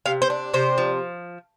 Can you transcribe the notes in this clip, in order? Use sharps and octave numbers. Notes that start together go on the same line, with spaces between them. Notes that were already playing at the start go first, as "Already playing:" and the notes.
C3 F5
C5
D4
C3 C5
F3